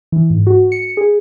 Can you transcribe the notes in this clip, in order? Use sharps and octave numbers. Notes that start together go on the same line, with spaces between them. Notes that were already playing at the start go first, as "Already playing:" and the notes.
E3
G#2
F#4
C#7
G#4